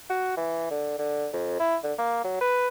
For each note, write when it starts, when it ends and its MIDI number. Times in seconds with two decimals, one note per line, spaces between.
0.10 0.33 66
0.37 0.71 52
0.71 0.96 50
0.99 1.28 50
1.33 1.56 41
1.60 1.77 64
1.84 1.93 50
1.98 2.19 58
2.24 2.37 54
2.41 2.68 71